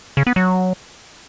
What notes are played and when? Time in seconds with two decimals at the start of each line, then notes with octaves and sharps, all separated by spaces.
0.17 C#3
0.27 B3
0.36 F#3